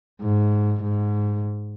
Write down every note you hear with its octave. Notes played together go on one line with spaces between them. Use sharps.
G#2
G#2